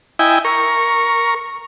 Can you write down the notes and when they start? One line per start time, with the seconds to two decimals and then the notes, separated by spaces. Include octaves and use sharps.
0.19 E4 D#5 G5 G#5
0.45 A#4 C#6